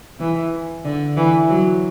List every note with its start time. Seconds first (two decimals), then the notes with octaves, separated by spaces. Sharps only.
0.19 E3
0.85 D3
1.16 E3
1.49 F#3